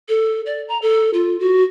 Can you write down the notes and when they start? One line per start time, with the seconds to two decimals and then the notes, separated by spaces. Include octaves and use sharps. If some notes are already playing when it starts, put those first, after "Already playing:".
0.09 A4
0.46 D5
0.68 A#5
0.82 A4
1.14 F4
1.40 F#4